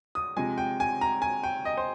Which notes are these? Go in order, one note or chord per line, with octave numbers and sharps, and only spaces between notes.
D#6
C3 F3 G#3 G#5
G5
G#5
A#5
G#5
G5
D#5
C5